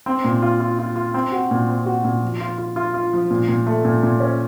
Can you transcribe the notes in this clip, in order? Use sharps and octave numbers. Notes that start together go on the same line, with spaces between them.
C4
A#2
F4
F4
F4
F4
C4
F#4
A#2
C4
F#4
A#2
F3
F4
F4
F4
F4
F3
A#2
A#2
A3
A#2
A#2
C#4